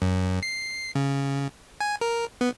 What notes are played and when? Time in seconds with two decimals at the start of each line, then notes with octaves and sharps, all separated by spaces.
0.02 F#2
0.43 C7
0.95 C#3
1.81 G#5
2.01 A#4
2.41 B3